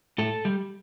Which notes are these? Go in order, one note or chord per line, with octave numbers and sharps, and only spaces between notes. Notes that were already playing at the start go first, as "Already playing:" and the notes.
A2 A4
G3